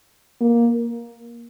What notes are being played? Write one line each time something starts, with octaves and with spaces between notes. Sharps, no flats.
A#3